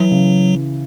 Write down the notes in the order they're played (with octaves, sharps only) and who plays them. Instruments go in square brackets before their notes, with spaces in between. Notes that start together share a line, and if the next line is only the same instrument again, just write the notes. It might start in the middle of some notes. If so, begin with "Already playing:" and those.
Already playing: [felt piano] E3 [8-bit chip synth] F#3
[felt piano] C#3